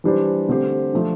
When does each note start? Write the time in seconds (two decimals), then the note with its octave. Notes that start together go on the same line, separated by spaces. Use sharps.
0.04 E3 G3 D4 G4 C5
0.49 D3 A3 C4 G4 C5
0.93 F3 A3 D4